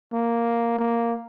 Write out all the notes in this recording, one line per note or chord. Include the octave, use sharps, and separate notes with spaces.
A#3
A#3